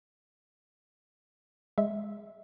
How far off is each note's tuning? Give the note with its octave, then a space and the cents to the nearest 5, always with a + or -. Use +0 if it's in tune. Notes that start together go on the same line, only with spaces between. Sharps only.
G#3 -5 E5 -10